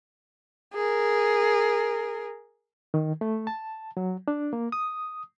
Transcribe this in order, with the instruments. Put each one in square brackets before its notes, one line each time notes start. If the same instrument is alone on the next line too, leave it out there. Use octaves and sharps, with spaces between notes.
[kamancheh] G#4 A#4
[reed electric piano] D#3
A3
A5
F#3
D4
A#3
D#6